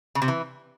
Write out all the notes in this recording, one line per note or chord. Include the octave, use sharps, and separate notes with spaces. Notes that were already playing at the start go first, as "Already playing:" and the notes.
C#3
C3
E3